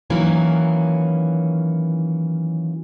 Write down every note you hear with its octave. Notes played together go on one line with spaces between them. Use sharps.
D#3 E3 F#3 A#3 C#4